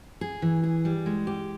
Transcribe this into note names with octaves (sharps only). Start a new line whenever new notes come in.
G#4
E3
G#4
G3
G#3
G4